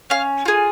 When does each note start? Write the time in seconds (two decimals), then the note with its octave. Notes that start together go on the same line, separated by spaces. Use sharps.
0.10 C#4 F5
0.45 F4 G#4